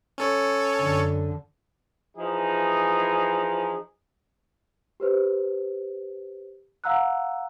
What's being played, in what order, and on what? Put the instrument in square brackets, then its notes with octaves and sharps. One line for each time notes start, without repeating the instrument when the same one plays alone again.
[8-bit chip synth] C#4 A4 C#5
[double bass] F#2 D3
[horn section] E3 F3 D#4 G#4
[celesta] G4 B4 C5
F5 F#5 A#5 E6 F#6